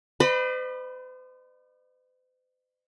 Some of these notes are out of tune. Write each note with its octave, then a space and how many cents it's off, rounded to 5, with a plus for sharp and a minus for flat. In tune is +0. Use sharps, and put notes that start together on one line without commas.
C5 -45 D#5 -45 B5 +0